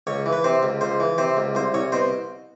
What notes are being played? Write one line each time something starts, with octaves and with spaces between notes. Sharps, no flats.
C#2 C#5
E3
B4
C3 C5
C#2
C#2 C5
E3
C3 C5
C#2
C2 C5
C2 C#5
B2 C5